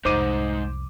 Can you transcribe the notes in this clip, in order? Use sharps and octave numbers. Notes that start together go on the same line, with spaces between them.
C2 F2 G#2 D#4 C5 D6 D#7